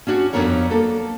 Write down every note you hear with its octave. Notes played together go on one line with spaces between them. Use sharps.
C#4 D4 F#4 C#5
F2 C3 B3 D4 A#4 C#5
A#3 A4